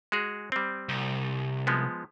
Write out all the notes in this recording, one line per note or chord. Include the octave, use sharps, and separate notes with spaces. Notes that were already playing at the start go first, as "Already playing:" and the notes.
G#3 F#4 G#4
G3 C4
C2
F3 G#3 B3